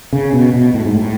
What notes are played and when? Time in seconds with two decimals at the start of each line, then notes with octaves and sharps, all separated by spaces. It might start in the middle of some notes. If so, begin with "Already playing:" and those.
0.13 C#3
0.33 B2
0.54 B2
0.74 A2
0.85 G#2
0.95 A2